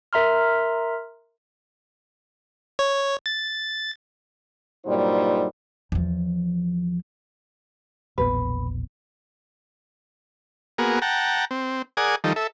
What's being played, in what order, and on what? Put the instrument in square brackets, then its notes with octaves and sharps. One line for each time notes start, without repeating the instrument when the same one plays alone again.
[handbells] A#4 E5 A#5 C6 F6
[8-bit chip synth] C#5
A6
[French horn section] G2 A#2 F#3 G3 D#4 C5
[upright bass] E2 F3
[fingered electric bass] E1 A#1 B3 [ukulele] B4
[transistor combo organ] A#3 B3 F#4 G#4 A#4
F#5 G5 A5 A#5
C4
G#4 A#4 D5 F#5 G#5 D#6
D#3 F3 G3 D#4 A4
A4 E5